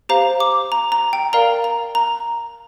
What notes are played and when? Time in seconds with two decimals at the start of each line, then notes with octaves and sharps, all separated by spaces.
0.09 G4 C5 F5 A#5
0.40 D6
0.72 A#5
0.92 A#5
1.13 G5
1.33 A#4 D5 F5 A#5
1.64 A#5
1.95 A#5